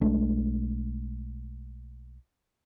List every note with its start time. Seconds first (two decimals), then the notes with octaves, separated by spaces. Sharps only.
0.01 B1 G#3 A3 D4